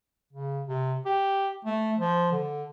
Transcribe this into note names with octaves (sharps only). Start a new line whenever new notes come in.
C#3
C3
G4
A3
F3
D3